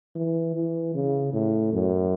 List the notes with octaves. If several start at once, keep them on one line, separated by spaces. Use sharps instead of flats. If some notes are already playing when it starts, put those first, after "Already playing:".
E3
E3
C#3
A2
F#2